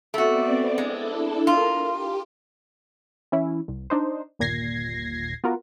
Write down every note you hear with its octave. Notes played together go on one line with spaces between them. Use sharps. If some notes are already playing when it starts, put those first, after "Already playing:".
A3 B3 C4 F#4 D5
G#3 D4 E4 A4
F4 A#4
G4
E3 C#4 E4
C2
D4 D#4 C5
G1 D#2 A#2 G#6 A#6 C7
B3 F4 F#4 A#4